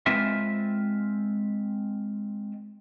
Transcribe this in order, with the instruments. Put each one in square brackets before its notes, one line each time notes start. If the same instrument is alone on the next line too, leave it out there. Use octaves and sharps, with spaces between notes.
[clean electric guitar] G#3 C4 F4 A#4 B4 E5